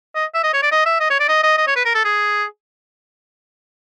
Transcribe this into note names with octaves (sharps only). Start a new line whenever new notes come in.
D#5
E5
D#5
C#5
D5
D#5
E5
D#5
C#5
D5
D#5
D#5
D#5
C#5
B4
A#4
A4
G#4